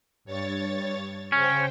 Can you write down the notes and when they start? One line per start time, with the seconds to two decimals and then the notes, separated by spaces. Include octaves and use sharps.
0.25 G2 C#5 A6
1.32 C#3 C#4 C5 G5